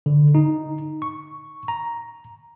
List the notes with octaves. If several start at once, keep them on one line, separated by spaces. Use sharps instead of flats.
D3
D#4
C#6
A#5